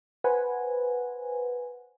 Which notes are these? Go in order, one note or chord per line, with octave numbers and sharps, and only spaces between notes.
B4 C5 F#5 G#5